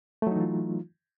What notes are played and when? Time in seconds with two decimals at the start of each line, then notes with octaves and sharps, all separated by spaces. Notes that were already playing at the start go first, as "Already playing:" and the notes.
0.22 A3
0.27 F#3
0.31 D#4
0.36 E3
0.40 F4